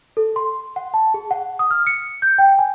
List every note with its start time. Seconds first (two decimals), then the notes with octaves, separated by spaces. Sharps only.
0.17 A4
0.36 C6
0.76 F#5
0.94 A5
1.14 G#4
1.31 F#5
1.59 D#6
1.71 F6
1.87 C#7
2.22 G6
2.38 G5
2.59 G#5